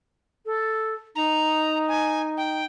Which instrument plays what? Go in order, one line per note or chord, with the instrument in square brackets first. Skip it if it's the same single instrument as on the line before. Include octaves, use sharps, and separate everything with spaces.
[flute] A4
[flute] D#4 [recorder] A#5
[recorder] G#5
G5